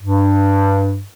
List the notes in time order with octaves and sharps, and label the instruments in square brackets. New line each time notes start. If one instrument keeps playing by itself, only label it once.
[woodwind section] G2